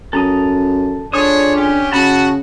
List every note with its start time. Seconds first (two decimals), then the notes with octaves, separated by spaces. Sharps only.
0.13 F#2 A4 A#5 D#6
1.14 D3 D4 F4 G#4 C#5 D#6
1.56 C#4 G4
1.92 C#3 F#4 A5 B5